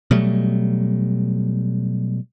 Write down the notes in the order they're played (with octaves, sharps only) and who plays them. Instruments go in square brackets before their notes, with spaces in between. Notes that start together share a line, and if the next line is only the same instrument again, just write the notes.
[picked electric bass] B2 F#3 G3 A3